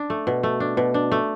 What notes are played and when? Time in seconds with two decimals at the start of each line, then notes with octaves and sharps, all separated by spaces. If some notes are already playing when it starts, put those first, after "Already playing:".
Already playing: D4
0.10 A3
0.27 B2
0.43 A3
0.60 D4
0.77 B2
0.94 D4
1.12 A3